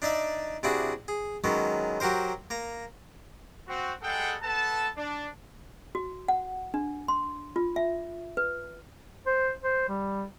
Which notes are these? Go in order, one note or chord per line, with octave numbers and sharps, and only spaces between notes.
D4 D#4 D5 E5
C3 D4 E4 F#4 G#4
G#4
D#3 F#3 G#3 B3 C#4
F#3 F#4 G4 A#4 C5
A#3 A#5
C4 F#4
G3 G#3 G#4 A4 F#5 G5
B3 A4 B4 A5
D4
F#4
F#5
D4
C6
F4
E5
B4
C5
C5
G3